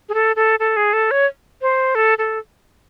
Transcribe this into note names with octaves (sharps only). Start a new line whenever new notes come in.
G#4
A4
A4
A4
G#4
A4
C#5
C5
A4
A4